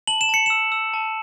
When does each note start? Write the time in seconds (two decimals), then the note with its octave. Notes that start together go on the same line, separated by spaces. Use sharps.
0.07 A5 F#7
0.21 E7
0.29 A5 C#7
0.46 E6 E7
0.72 E6
0.94 A5